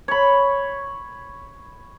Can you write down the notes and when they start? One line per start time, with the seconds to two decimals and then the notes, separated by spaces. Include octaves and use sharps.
0.08 C#5 B5